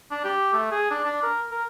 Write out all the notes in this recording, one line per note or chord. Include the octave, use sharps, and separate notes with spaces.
D4
G4
A3
G#4
D4
D4
A#4
A#4